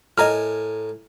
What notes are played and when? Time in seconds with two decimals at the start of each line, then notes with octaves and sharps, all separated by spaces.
0.18 A2 A#4 D#5 G#5 A#5 F6